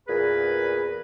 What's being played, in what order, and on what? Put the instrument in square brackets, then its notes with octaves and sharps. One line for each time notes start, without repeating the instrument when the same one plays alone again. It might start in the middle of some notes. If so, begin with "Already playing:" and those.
[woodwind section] E2 A#2 G#4 A#4 B4